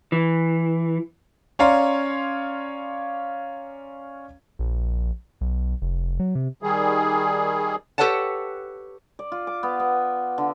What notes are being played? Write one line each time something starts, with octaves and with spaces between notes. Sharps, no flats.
E3
C#4 C#5 D5 F5 A#5 C6
A#1
B1
F1
F#3
C3
D#3 G3 G#4
G4 A4 B4 C#5 F#5 A5
D5
F4
D6
B3
B3
D3